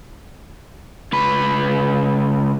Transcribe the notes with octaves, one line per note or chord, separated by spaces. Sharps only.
C#2 B4